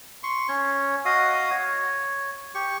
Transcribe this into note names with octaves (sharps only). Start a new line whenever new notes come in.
C6 C#6
C#4 C#5
F#4 D#5 F5 D#6
C#5
G4 C#6